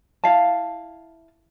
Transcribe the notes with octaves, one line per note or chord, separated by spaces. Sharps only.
E4 F5 A5